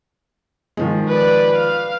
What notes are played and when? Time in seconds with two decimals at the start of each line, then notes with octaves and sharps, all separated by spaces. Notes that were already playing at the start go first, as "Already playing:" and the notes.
0.77 D#3 F3 G#3
1.08 B4 D5
1.55 F5